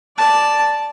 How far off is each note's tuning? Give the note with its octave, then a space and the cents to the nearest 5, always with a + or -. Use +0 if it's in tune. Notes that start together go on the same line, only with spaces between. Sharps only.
D5 +0 A5 +0